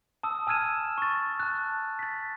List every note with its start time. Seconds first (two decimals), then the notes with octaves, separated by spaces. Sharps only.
0.23 A5 D#6 E6
0.47 G#5 E6 F6 G#6 D#7 E7
0.98 C#6 A6
1.40 A5 F#6
1.99 A6 B6